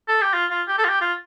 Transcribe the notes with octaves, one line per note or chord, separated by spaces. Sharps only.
A4
G4
F4
F4
G4
A4
F4
G4
F4